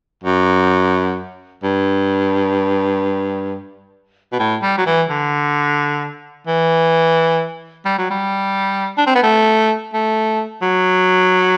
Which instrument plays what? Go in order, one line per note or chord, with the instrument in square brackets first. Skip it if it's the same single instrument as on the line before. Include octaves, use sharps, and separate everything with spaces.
[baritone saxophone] F#2
G2
B2
A2
G3
F#3
E3
D3
E3
G3
F#3
G3
D4
C4
B3
A3
A3
F#3